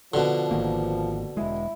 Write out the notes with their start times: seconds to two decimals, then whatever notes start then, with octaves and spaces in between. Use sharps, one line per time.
0.14 B2 D3 F3
0.51 G#1 D#3 A#3
1.37 E1 G#3 E4